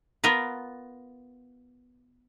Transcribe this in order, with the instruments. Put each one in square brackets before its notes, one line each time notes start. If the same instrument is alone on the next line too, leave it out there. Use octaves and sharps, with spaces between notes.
[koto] B3 F4 A#4 B4